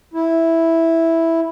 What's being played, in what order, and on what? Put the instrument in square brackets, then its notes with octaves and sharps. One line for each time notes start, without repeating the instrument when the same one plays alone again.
[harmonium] E4